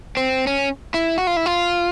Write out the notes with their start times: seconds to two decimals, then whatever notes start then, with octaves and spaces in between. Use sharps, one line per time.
0.17 C4
0.47 C#4
0.94 E4
1.18 F#4
1.27 F4
1.37 E4
1.46 F4